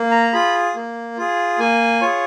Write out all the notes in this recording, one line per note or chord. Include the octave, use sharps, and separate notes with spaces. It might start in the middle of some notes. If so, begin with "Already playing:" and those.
Already playing: A#3
A#5
F4 G#4 B5
A#3
F4 G#4
A#3 G#5
F4 G#4 C#5